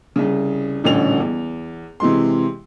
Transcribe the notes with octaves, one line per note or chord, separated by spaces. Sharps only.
C2 C#3
D#1 A1 D3 C#4 F7
E2
C3 E3 G#3 C6